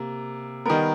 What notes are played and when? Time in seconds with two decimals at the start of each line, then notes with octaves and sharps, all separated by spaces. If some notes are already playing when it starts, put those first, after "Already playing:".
Already playing: C3 A#3
0.65 D#3 G3 B3 A#4